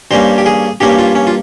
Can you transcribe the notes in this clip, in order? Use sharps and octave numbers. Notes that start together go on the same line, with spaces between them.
G2 G3 A#3 C#4 C5
G4
G#4
G2 G3 A#3 C#4 G4
F4
C#4
F4